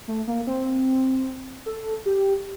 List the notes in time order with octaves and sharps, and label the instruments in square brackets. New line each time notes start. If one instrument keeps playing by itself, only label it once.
[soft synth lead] A3
A#3
C4
A4
G4